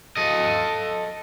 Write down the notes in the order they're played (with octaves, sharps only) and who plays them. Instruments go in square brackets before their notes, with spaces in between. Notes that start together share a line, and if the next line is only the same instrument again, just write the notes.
[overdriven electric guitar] A4 D#5